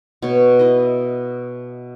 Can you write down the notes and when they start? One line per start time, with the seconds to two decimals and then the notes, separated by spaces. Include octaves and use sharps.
0.22 B2 C#5
0.59 E4 D#5